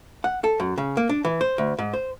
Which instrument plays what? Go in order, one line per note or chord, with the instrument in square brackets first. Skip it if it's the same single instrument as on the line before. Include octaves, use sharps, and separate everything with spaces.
[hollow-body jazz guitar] F#5
A4
F#2
C#3
A#3
D4
E3
C5
D2
G#2
C5